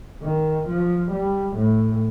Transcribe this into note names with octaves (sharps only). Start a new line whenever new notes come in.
D#3
F3
G3
A2